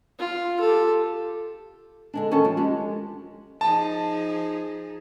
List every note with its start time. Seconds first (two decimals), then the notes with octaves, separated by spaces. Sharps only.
0.19 F4
0.60 G4 A4
2.14 D3 G#3 D4
2.31 D#3 C#4 A4 A#4 C#5 A5
2.45 F3
2.57 G#3 D4 G4
3.61 F3 D#4 G#4 A5